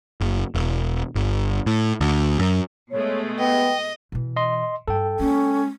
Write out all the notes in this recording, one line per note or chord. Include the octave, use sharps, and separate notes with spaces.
F#1
E1
G1
A2
D2
F#2
B2 G#3 A3 C#5
B3 D#5 G5
B2 E3
D#5 C6
G2 A4 G5
G#3 A#3 C#4